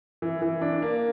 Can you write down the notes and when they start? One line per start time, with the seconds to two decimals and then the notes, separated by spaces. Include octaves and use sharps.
0.22 E3
0.42 E3
0.62 D4
0.82 A#3